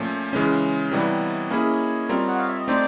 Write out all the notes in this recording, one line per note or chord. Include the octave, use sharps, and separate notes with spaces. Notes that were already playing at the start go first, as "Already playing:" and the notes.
Already playing: A#2 F3 A3 C#4
C#3 E3 G#3 C#4
C3 E3 G3 B3 C#5 D#5
A#3 C#4 E4 G#4
G3 C4 F4 A#4
F#5
F5
E5
D#5
A3 C4 D#4 C5 D5